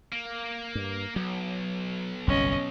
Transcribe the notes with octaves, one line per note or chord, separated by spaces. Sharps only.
A#3
G2
B1 F#3
G1 C2 F2 C#4 D#5